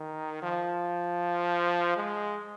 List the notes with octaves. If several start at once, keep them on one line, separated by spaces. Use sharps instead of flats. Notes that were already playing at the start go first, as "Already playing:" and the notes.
Already playing: D#3
F3
G#3